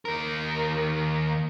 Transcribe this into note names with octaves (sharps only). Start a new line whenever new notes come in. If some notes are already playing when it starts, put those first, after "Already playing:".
D#2 A#4